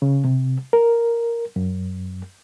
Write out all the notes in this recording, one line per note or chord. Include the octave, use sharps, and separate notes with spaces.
C#3
C3
A#4
F#2